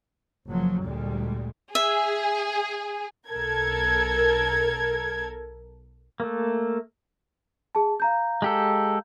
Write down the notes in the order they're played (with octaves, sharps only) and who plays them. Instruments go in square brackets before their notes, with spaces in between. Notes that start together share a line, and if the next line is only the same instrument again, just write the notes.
[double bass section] F#1 F#2 F3 F#3
D2 A#2 G3 G#3
[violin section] G#4 [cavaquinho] E5
[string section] B1 A4 A#4 G#6
[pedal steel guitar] A3 A#3
[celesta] G#4 A5
F5 A#5 G6
[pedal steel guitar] G#3 G4 A4